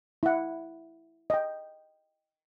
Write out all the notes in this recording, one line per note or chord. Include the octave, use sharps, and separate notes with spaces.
E4 F#5
D#5 G5